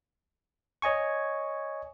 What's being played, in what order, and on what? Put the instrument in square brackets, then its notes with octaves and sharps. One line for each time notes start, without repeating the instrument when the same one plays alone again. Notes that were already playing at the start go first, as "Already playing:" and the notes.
[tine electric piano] C#5 D#5 G#5 C#6